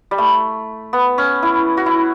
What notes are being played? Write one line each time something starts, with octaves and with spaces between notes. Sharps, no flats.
G3
A3
B3
C#4
E4
F#4
E4